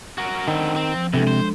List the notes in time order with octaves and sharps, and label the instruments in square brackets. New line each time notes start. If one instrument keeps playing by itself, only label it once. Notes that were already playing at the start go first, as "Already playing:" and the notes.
[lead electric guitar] F#4 A#4
[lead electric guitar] D3 C4 [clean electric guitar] D#3
[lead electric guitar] C4
[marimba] F3
[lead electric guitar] E2 [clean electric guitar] C3 [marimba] G#3 D4 A4
[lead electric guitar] C5